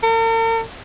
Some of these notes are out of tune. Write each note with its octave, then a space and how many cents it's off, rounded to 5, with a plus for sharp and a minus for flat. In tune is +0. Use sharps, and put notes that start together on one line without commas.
A#4 -45